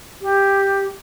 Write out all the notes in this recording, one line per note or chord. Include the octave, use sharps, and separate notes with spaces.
G4